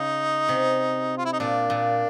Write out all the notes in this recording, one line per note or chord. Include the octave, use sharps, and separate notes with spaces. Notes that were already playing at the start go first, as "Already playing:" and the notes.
Already playing: C#3 D#4
C3
F4
E4
D#4
A#2 D4
A#2